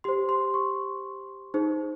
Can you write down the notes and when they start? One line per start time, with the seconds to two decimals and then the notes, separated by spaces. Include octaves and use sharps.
0.04 G4 C5 C6
0.29 C6
0.54 C#6
1.54 D#4 G#4 C5